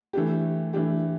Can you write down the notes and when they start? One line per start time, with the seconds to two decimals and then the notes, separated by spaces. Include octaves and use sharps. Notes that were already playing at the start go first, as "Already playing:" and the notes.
0.13 E3 A3 D4 G4
0.73 E3 A3 D4 G4